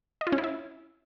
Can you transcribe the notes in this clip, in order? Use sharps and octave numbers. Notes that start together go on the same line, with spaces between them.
D#5
F4
C#4
E4
E5